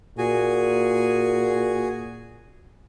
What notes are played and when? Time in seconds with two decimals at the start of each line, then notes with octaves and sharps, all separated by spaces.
0.18 A#2 F#4 G#4 G#5